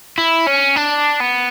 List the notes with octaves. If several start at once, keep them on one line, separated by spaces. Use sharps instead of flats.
E4
C#4
D4
B3